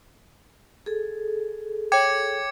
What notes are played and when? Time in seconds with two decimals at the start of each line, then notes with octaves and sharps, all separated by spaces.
0.86 G#4 A4
1.92 C#5 G5 D6 G#6 C#7